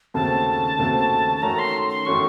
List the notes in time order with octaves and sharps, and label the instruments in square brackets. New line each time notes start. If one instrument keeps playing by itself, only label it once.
[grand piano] D#2 C#3 A3 C4 F#4 [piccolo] A5
[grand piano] D#2 C#3 A3 C4 F#4
[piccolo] A5
[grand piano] D#3 A3 C#4 F#4 [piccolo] A#5
[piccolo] C6
C6
[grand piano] D#3 A3 C#4 F#4 [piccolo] C#6